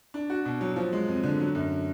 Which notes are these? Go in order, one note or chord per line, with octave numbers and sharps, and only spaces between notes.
D4
F#4
B2
F#3
F3
G#3
F2
D3
F#3
F#2